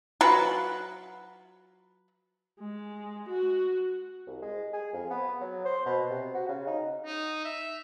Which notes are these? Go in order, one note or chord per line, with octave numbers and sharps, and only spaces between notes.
F#3 F4 F#4 B4
G#3
F#4
C2
G#3
G#4
F2
B3
F#3
C5
B2
C3
F#4
C#3
D#4
D#4
E5